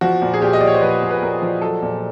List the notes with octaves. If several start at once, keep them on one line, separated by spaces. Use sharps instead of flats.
F3 F#4
A#2
G#4
A#2 G4
D#5
F3 D5
C#5
C5
F3 B4
A#2
B4
A#2 A#4
F3
F#3 A4
A#2